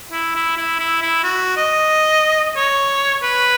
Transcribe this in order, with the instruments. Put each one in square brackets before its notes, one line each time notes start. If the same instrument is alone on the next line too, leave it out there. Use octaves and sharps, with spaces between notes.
[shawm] E4
E4
E4
E4
E4
F#4
D#5
C#5
B4